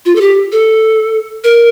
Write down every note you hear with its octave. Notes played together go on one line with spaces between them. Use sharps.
F4
A4
G4
A4
A#4